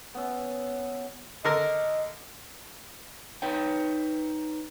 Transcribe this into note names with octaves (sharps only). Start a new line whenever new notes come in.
B3 C#4 E5
D3 A#4 D#5
D#4 B4 C#5 G5